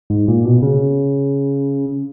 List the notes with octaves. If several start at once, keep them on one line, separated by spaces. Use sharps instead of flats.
G#2
A#2
B2
C#3